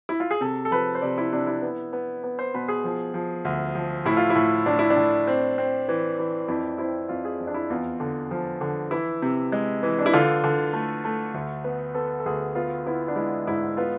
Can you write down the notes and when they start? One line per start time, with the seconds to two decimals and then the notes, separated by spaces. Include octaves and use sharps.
0.09 E4
0.20 F4
0.31 G#4
0.41 C3 A4
0.65 A4
0.71 F3 B4
0.95 C5
1.01 C3 D5
1.18 E4
1.32 C3 D4
1.47 E4
1.62 B3
1.93 B3
2.24 B3
2.39 C5
2.54 B2 B4
2.68 G#4
2.84 F3
3.14 F3
3.45 D2
3.75 F3
4.05 A2 E4
4.17 F4
4.30 E4
4.35 A2
4.66 A2 D4
4.79 E4
4.90 D4
4.97 A2
5.27 C4
5.58 C4
5.88 E3
6.19 E3
6.48 F2 E4
6.78 C4 E4
7.09 F2 F4
7.25 G#4
7.40 F2
7.47 D4
7.54 E4
7.70 E2 F4
8.00 D3
8.31 F3
8.61 D3
8.91 E3 E4
9.22 C3
9.52 G#3
9.83 E3
9.99 D4
10.06 E4
10.13 D3 F4
10.44 D3
10.73 A3
11.05 A3
11.34 D2
11.64 B3
11.94 B3 A4
12.19 A4
12.26 D2 G#4
12.55 B3 F4
12.86 B3 E4
13.08 D4
13.16 G#3 E4
13.47 G#2 E4
13.77 B3 F4